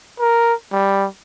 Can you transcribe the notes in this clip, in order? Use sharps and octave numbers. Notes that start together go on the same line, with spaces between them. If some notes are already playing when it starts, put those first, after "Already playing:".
A#4
G3